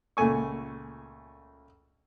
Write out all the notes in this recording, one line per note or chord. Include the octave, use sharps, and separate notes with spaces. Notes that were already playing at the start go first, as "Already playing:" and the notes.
C#2 A#2 A3 G#5 C#6